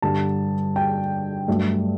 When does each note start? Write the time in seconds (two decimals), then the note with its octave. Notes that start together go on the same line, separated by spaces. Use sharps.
0.02 G2 D3 G3 A5
0.76 G5
1.48 G2 F#3 A3